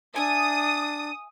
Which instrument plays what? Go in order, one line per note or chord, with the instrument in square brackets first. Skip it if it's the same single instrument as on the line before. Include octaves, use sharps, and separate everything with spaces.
[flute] D4 [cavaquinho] E5 G#5 [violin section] D#6